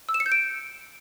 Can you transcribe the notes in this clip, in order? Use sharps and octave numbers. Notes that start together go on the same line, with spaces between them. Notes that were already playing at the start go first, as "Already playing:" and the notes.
E6
E7
C#7
G6
D7